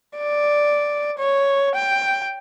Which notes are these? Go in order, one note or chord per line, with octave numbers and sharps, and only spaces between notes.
D5
C#5
G5